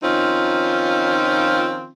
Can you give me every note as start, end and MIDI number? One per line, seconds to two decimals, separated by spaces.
0.03 1.91 51
0.03 1.91 53
0.03 1.91 60
0.03 1.91 61
0.03 1.91 63
0.03 1.91 65